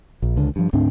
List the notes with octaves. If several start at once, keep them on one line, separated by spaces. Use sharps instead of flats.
A#1
C#2 D3
G2 F3
D2 G#2 C4 D4